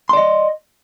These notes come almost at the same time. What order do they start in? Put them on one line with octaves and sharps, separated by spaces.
C6 D5 D#5